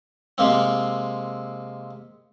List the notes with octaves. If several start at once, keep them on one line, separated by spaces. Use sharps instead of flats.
C3 G#3 A#3 C4